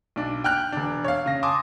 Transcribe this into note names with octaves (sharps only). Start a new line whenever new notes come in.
B1 D4
G5 F6 F#6
E1 D4
C#5 F5
C#3 A#6
G#5 A5 C6 D6 D#6